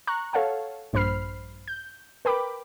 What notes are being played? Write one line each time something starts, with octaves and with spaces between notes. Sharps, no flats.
A#5 C#6 F#6
A4 C#5 F5 F#5 A5
A#1 G2 C5 B5 F6 C7
G6
A#4 B4 G5 B5 D6